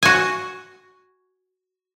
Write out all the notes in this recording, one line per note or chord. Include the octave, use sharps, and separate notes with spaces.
F#4 G#5